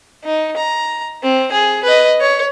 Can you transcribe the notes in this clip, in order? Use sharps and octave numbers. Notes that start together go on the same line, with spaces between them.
D#4
A#5
C4
G#4
B4 D#5
C#5